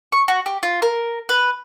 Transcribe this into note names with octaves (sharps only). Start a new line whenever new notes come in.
C#6
F#4
G4
F4
A#4
B4